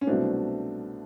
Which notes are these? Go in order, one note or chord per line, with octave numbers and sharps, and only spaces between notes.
C#4
C2 B2 F#3 A3 C4 D4